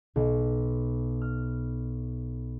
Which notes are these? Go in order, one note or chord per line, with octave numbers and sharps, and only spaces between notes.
B1
F6